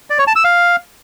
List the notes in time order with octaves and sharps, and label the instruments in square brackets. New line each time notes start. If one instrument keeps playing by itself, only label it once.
[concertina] D5
C#5
A5
E6
F5